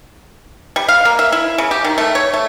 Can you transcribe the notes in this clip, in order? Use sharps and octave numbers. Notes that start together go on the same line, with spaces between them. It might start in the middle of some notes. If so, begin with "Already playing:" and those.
G3
F5
A#3
E5
E4
C#3
G4
D#3
A3
C#5
A3